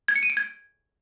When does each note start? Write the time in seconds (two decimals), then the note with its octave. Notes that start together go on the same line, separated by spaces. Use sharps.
0.08 G#6
0.16 C#7
0.23 D#7
0.30 D7
0.37 G#6